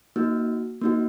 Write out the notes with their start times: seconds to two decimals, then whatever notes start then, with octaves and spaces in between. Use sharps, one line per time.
0.16 A#3 D#4 F#4
0.81 A#3 D#4 F#4